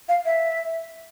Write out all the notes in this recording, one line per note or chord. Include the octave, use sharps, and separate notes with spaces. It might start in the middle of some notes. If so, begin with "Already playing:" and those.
F5
E5